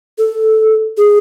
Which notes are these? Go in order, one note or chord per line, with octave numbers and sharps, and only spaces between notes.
A4
G#4